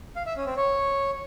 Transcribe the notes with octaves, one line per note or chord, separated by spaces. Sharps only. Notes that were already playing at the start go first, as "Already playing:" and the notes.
F5
E5
C#4
C4
C#5